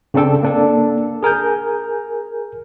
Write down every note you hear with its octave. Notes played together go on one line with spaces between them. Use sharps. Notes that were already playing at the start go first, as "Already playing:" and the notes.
C#3 C4 D4 A4 G5
A#3 D4 A4
G#4 A#4 G#5 G6